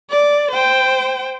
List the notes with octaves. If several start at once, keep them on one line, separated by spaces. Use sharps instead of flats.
D5
C5 G5